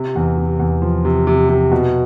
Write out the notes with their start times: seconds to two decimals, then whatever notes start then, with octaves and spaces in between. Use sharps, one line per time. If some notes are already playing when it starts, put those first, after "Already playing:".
Already playing: C3
0.15 E2
0.37 C3
0.59 E2
0.82 F3
1.05 C3
1.27 C3
1.49 C3
1.72 B2